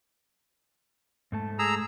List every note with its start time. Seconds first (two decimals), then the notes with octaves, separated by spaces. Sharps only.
1.32 G#2 A3 A5
1.59 G#4 A#5 E6